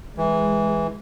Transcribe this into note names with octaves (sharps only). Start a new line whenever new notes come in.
E3 G#3